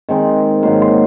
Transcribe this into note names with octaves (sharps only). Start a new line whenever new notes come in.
D#3 G#3 C4 D#4
G#2 D#3 F#3 A#3 C6
C6